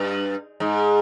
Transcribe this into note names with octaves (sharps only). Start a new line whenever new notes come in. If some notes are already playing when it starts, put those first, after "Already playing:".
Already playing: G2
G#2